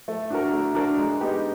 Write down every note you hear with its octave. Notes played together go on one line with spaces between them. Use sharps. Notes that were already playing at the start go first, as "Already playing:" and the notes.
A3
D4 F#4 A#4
A3
D4 F#4 A#4
G#3
B3 D#4 G4 B4